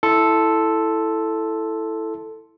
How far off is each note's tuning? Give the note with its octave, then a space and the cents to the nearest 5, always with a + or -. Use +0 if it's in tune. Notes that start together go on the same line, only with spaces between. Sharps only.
E4 +0 A4 +0 C6 +0